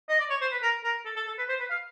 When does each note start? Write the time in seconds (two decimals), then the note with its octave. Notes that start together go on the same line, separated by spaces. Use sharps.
0.09 D#5
0.19 D5
0.30 C#5
0.41 C5
0.52 B4
0.62 A#4
0.84 A#4
1.06 A4
1.16 A4
1.27 A4
1.38 B4
1.49 C5
1.60 B4
1.70 F5